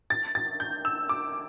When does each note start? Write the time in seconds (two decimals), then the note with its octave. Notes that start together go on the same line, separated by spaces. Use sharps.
0.10 A6
0.35 A6
0.60 G6
0.85 E6
1.09 D6